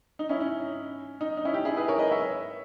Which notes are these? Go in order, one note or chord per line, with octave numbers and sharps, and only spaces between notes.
D#4
C#4 E4
C#4
D#4
D#4
C#4 E4
D#4 G4
E4 G#4
G#4 B4
A#4 C#5
B4 D#5
C#5 E5